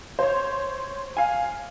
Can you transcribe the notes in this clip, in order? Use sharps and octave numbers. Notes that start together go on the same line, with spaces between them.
C5 C#5
F5 G#5